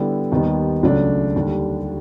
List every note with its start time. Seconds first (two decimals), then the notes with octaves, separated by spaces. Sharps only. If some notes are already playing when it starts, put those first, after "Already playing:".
Already playing: D3 G3 B3 E4
0.31 D#2 D#3 G3 B3
0.83 C#2 C#3 F#3 A3 D4
1.36 D#2 D3 G3